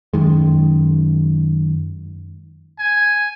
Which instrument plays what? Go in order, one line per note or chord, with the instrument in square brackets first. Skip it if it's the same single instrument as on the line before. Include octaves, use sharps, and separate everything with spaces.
[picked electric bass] F#2 D#3 G#3
[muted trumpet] G#5